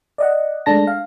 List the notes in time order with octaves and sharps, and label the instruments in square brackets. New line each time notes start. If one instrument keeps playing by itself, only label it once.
[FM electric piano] D5 D#5 F#5
G#3 A3 D4 A5 A#6
F5